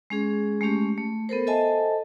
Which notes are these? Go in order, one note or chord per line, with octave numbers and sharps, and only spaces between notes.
G#3 C#4 G#4
G#3 A3 C#4 G4
A3
B3 A4 A#4 C5
A4 C5 D#5 E5 G#5 A5